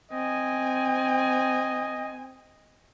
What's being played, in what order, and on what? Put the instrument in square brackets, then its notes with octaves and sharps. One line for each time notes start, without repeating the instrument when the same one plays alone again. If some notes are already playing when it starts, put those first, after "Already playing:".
[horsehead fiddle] C4 G#5 [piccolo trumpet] D#5